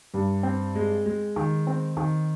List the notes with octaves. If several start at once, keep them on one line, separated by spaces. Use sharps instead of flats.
G2
C4
G#3
G#3
D#3
C4
D#3